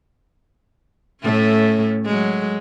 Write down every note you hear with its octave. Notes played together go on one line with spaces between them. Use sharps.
A2 A3 C#4
F#3 G#3